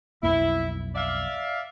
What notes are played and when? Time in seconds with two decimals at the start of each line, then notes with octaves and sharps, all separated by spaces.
0.23 B1 F2 A#3 E4
0.95 D5 E5 F5